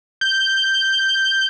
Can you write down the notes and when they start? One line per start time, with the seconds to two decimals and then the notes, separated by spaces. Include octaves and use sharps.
0.21 G6